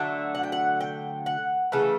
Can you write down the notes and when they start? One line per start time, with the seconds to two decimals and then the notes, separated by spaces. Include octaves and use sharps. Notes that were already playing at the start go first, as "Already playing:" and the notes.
Already playing: D3 F#3 A3 E5
0.35 F#5
0.43 G5
0.52 F#5
0.80 G5
1.26 F#5
1.72 C#3 E3 A3 A4